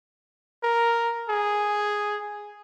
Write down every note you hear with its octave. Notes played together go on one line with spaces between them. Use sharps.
A#4
G#4